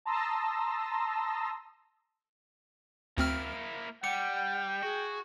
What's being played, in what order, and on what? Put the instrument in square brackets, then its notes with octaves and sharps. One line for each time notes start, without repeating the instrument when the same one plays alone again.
[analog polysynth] A5 A#5 C6 D#6 E6 A#6
[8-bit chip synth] D2 C4 F6 [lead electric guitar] A#3 E4
[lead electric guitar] G3 [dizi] F#5 [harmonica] G5 [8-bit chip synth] C#7
[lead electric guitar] F#4 [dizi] G#4